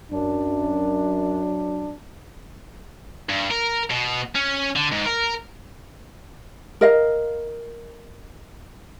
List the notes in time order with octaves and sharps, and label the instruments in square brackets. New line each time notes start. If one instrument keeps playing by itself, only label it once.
[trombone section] F#2 D4
[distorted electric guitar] G2
A#4
B2
C#4
D3
G#2
A#4
[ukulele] A#4 D#5 F5